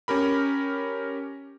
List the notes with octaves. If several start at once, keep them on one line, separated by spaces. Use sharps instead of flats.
C#4 G4 A#4 B5